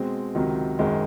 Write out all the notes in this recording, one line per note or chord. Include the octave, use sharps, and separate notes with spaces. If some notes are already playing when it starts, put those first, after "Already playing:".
Already playing: B2 G#3 C4
C#2 C3 D#3 F#3
G#1 F#2 D#3 G#3